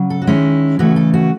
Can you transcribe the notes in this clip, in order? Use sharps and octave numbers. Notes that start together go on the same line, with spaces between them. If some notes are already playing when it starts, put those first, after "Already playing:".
Already playing: C#3 F#3
A4
F#4
D#3 G#3 C#4 E4
C#3 E3 A3 F#4
A4
F#4